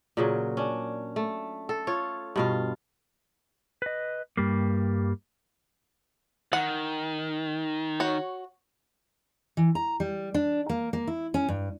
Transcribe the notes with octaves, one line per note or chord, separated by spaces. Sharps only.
A#2 C#3 F#3
C#4 D4
A3
A4
F4 C#5
G2 B2 F4
B4 D#5
G2 G3 A#3
D#3 F#5
F#4 C#5
E3
A#5
G3
D4
A#3
A#3
E4
C#4
G2